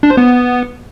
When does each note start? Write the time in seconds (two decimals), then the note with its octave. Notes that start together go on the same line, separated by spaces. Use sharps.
0.03 D4
0.10 C5
0.17 B3